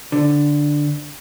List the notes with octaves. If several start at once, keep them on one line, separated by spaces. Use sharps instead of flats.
D3